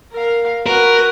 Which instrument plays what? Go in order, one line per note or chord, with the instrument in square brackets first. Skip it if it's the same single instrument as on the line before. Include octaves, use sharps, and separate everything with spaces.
[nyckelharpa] A#4 F5
[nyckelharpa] F#4 B4 [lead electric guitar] A#4